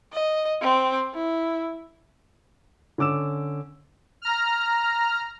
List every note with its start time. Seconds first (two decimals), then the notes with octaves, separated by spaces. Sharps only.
0.13 D#5
0.62 C4
1.14 E4
2.98 D3 C#4 D6 E6 E7
4.22 A#5 F6